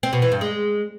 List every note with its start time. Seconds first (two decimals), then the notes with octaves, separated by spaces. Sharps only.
0.03 C4
0.13 B2
0.22 E3
0.32 G2
0.41 G#3